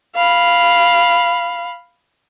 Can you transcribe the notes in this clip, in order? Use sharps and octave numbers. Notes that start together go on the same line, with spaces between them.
F5 B5